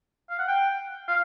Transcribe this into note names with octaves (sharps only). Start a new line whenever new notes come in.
F5
F#5
G5
F5